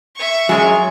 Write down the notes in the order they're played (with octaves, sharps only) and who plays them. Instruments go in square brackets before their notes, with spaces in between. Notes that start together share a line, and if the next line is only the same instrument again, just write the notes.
[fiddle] E5 C#6
[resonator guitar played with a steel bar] F#2 G#3 [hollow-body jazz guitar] F#3 [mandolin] G#4 C#5 C6